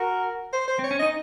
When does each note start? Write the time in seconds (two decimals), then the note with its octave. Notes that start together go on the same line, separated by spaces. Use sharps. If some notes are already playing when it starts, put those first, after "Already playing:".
Already playing: F#4 A#4
0.53 C5
0.68 C5
0.79 C4 C#5
0.91 C#4
0.99 D#4 D#5